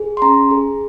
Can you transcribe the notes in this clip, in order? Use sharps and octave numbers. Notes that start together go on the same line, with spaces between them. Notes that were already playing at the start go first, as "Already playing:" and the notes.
Already playing: G#4
C6
C#4 A#5
G#4